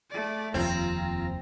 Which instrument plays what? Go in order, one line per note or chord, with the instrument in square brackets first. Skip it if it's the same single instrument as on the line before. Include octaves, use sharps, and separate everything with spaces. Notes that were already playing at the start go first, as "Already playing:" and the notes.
[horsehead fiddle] A3 D5
[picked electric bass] F1 D#2 F3 [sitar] C4 [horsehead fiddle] F4 A#5